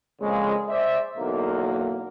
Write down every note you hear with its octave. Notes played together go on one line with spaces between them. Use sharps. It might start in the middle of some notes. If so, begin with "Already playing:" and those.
F2 A#2 C#3 F3 G#3
C5 D5 E5
B1 E2 B2 D3 A#3